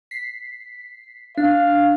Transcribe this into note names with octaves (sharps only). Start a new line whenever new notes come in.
B6 C7
D4 F5